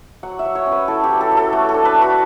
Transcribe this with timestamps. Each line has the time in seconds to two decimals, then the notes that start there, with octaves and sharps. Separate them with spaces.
0.23 F#3 F#5
0.39 E5
0.45 F#3
0.55 C#5
0.66 C#4
0.72 B4
0.88 E4 A4
1.04 G4
1.09 F#3
1.21 A4
1.32 F#3
1.37 A4
1.53 A3 F#4
1.69 A4
1.74 D4
1.85 B4
1.96 D4
2.02 F#4